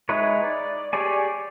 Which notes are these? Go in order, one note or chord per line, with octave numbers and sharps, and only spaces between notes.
G#3 D#4 E4 B4 C#5
D5
G4 G#4 C#5 D5 G#5